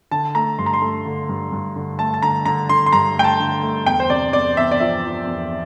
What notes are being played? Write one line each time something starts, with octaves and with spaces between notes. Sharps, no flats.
D3 A5
A3 A#5
G2 C6
A#5
C6
A3
D3
G2
G2
D3
A3 A5
A5
D3 A#5
D3 A#5
D3 C6
C6
G2 A#5
A3 G5
A5
D3
A3
E2 G5
C5
C3 D5
E2 D5
E2 E5
D5
F3 E5
F3
E2